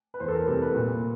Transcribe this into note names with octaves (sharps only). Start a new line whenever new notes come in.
B4
E2 C5
A4
A#4
C3 E3 G3 B3 A4
B4
A#2